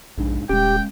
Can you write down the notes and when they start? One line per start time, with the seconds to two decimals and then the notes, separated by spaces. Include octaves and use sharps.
0.18 F1 A#1 G#2 D4
0.49 D#1 G#3 C#4 G4 G5